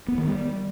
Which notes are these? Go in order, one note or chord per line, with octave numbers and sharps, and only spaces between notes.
B3
D#3
G3